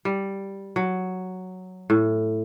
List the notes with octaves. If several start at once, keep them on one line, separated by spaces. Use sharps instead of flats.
G3
F#3
A2